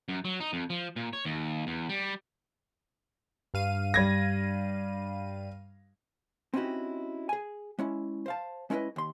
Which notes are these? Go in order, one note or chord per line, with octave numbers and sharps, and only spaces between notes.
F#2
F#3
D#4
F2
F3
A#2
C#5
D#2
E2
G3
G2 F5 D#7
G3 G#6 A#6
C4 C#4 D#4 E4 F#4 G4
G#4 G#5
G#3 C#4 E4
C5 F5 A5
G#3 C#4 E4 A#4 B4 D#5
D#2 C6